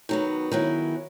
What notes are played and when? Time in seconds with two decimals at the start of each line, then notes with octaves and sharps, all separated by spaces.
0.09 D#3 F#3 B3
0.52 D#3 F#3 B3 E4 G#4